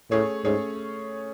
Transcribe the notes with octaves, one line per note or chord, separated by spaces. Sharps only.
A2 A3 C#4 G#4 C#5
G#2 A3 C#4 G#4 C#5